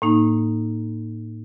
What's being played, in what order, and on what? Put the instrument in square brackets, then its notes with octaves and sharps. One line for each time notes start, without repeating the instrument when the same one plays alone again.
[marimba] A2 A#3 D#4